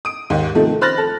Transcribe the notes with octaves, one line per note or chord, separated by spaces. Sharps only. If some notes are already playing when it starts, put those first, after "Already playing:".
D#6 D7
D#2 G#2
C3 D#3 F3 A3
C5 B5 F6 F#6 A6 A#6
A4